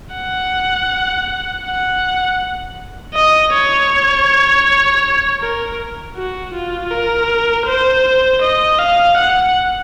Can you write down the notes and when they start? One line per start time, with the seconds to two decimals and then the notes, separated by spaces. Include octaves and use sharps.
0.15 F#5
1.65 F#5
3.15 D#5
3.53 C#5
5.41 A#4
6.16 F#4
6.53 F4
6.91 A#4
7.66 C5
8.42 D#5
8.78 F5
9.17 F#5